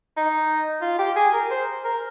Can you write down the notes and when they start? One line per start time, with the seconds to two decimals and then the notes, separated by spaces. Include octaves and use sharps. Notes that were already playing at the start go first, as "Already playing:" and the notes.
0.17 D#4
0.82 F4
0.99 G4
1.16 G#4
1.33 A#4
1.50 C5
1.85 A#4